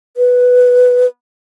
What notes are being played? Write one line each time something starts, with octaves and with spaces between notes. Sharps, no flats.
B4